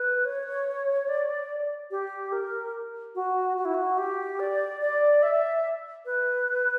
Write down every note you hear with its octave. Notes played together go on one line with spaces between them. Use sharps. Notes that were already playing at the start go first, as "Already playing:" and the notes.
Already playing: B4
C#5
D5
G4
A#4
F#4
F#4
E4
F#4
G4
D5
D5
E5
B4